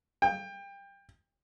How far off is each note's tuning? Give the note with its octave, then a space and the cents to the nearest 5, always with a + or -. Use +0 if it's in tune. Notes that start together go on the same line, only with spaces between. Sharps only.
G5 +25